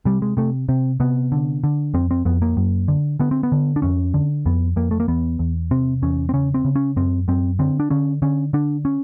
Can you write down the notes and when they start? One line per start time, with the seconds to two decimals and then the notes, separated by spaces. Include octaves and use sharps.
0.05 C3 G3
0.22 G#3
0.37 C3 A3
0.69 C3 C4
1.00 C3 B3
1.32 D3
1.64 D3
1.94 F2 C4
2.11 C4
2.25 F2 B3
2.42 A#3
2.57 F#2
2.88 D3
3.20 D3 B3
3.31 C4
3.43 B3
3.52 D3
3.76 D4
3.82 F2 C#4
4.14 D3
4.46 F2 B3
4.76 F2 A#3
4.91 A3
5.00 A#3
5.08 E2 B3
5.39 E2
5.71 C3 C4
6.02 E2 C#4
6.29 C4
6.34 C#3 C#4
6.54 C4
6.65 C#3
6.76 C#4
6.96 F#2 C4
7.28 F#2 C4
7.59 D3 C4
7.80 D4
7.90 D3 C#4
8.22 D3 C#4
8.53 D3 D4
8.85 C#4